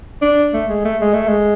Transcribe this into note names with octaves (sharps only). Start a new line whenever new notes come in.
D4
A3
G#3
A3
G#3
A3
G#3